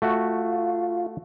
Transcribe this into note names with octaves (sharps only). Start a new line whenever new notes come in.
A3 F4 F#4